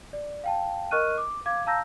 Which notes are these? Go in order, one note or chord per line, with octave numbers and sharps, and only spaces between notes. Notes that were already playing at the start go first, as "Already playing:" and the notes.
D5
F5 G5 A5
A#4 D#5 C#6 F6 F#6 D#7
D6
F5 D6 G#6
F5 A5 A#5 E6 G6 A#6